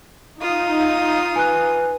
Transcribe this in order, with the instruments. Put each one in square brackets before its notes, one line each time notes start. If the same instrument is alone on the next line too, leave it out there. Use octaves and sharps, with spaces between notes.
[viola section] D#4 [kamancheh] F4 D#6 [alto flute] F5
[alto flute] B4 [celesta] G#5 F#6